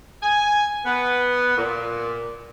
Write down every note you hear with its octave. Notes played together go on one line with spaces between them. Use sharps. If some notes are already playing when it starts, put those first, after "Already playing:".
G#5
B3
A#2